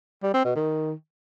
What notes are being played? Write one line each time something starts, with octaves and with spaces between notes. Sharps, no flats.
G3
C4
B2
D#3